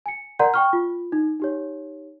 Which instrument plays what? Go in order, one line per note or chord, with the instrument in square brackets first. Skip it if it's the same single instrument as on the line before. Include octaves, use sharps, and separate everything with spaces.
[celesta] G#5 C#7
A#4 D5 F#5 A#5 C6 G6
G5 C#6 F6
F4
D#4
D#4 G4 C#5